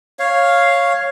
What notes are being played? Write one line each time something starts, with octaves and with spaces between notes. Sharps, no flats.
C#5 F5